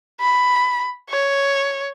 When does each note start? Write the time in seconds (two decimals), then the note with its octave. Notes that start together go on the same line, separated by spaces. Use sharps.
0.20 B5
1.10 C#5